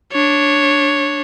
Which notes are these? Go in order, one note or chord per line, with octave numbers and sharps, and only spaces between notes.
D4 C#5